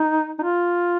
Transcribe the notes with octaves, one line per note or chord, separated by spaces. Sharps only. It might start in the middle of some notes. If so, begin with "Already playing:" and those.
Already playing: D#4
D#4
F4